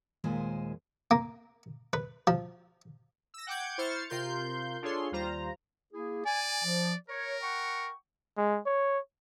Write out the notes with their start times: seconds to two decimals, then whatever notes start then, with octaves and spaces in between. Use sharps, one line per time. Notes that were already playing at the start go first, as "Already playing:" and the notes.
0.24 D#2 A#2 G#3 C5 G#5
1.11 A#3
1.93 B4
2.27 F3
3.34 E6 A#6
3.47 F#5 G5 D6 G6 G#6
3.78 E4 C5 C#6 F6 A6 C#7
4.10 C3 F4 A#4 C6 G6
4.82 D4 F4 G#4 A4 C#5 C6
5.11 D#2 G3 F4 C5 A#5
5.93 A#3 E4 G#4
6.26 D5 G#5
6.64 F3
7.09 A#4 C#5
7.43 F#5 G5 C#6
8.37 G#3
8.66 C#5